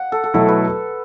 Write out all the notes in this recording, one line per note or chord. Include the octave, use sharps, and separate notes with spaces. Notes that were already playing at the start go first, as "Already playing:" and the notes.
Already playing: F#5
A4
A4
B2 F#3 A3 E4 A4
B4